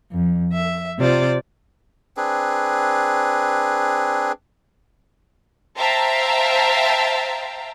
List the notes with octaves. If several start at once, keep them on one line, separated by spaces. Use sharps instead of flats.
F2
E5
C3 F4 C5 D5
C4 D4 G#4 B4
C5 E5 F5 G5 A5 A#5